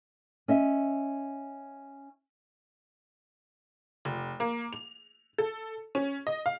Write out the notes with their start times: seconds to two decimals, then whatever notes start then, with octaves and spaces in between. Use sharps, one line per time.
0.48 C#4 D#5 E5
4.05 F1
4.40 A#3
4.73 F7
5.38 A4
5.95 C#4
6.27 D#5
6.46 F5